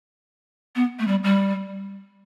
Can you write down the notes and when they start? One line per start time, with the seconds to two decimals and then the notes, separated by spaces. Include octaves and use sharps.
0.76 B3
0.99 A3
1.08 G3
1.24 G3